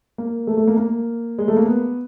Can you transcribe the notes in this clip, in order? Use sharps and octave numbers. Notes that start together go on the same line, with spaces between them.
A#3
A3
A3
A#3
A#3
G#3
A3
A#3
B3